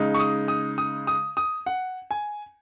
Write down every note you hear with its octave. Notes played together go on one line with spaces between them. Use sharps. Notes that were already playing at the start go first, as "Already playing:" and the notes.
Already playing: C#3 G#3 D#4
C#6
D#6
D#6
D#6
D#6
D#6
F#5
G#5